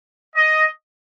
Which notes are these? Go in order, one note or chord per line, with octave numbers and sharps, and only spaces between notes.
D#5